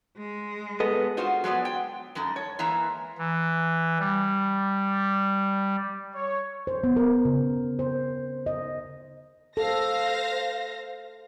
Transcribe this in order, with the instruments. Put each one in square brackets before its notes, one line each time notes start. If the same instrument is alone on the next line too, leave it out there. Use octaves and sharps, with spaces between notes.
[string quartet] G#3
[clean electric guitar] B3 D#5 [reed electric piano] G#4 A4 B4
[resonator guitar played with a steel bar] D#4 F4 F#4 C5
F#3 G#3 B3 D5
G5
F#2 G#3 A3 D#4
C#5
E3 G#3 A#3 E5 A#5
[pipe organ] E3
G3
[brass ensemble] C#5
[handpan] C5
B3
A#4
C#3
C5
D#5
[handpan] A4 [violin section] C5 F5 A#6